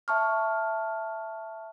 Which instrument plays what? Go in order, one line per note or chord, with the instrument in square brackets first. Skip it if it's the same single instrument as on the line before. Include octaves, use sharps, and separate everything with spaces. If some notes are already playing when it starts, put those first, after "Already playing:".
[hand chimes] E5 A5 C#6 F6